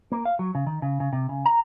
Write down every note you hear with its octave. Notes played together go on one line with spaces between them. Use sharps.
A#3
F5
F#3
C#3
D#3
C#3
C#3
C3
C#3
A#5